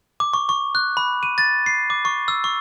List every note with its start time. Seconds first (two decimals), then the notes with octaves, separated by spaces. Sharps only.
0.20 D6
0.34 C#6
0.49 C#6
0.75 F#6
0.97 B5
1.23 D#7
1.38 A6
1.66 C7
1.90 D6
2.05 C#6
2.28 E6
2.44 C#6